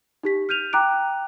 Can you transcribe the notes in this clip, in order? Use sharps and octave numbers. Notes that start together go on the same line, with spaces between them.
D#4 G4 B6
F6 G6 D#7 F7
G5 A#5 D6 F#6 D7